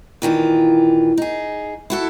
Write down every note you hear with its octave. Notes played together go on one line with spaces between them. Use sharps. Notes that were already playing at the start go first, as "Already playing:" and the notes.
A#2 D#3 E3 F4
D#4 G#4
E4 F#4 A4